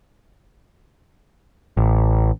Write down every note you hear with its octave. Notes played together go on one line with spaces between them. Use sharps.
A1